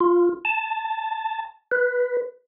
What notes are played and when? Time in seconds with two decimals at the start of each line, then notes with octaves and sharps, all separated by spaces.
0.01 F4
0.45 A5
1.71 B4